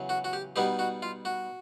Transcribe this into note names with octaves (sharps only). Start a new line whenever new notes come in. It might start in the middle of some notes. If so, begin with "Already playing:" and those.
Already playing: E2 C#3 F#3
F#4
F#4
G4
B2 G3 B3 D#4 G4
F#4
F4
F#4